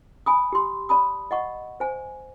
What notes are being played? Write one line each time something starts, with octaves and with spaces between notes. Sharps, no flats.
G#5 B5 D#6
G4 C6
D5 A5 B5 D#6
D#5 F#5 C#6
C5 G#5